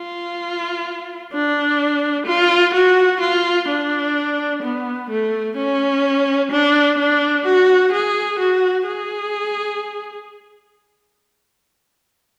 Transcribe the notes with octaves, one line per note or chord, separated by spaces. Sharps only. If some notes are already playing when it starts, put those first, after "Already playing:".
Already playing: F4
D4
F4
F#4
F4
D4
B3
A3
C#4
D4
D4
F#4
G#4
F#4
G#4